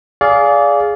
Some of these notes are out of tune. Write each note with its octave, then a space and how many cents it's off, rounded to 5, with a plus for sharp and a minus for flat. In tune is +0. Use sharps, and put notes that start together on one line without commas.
G#4 +0 D5 -25 F5 +0